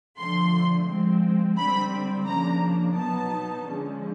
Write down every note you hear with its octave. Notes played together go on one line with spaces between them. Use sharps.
D3 F3 A3 C6
F3 G#3 C4
D3 G3 C4 B5
C#3 F3 A#3 D4 A#5
B2 F#3 B3 D#4 A5
D3 F3 G#3 C#4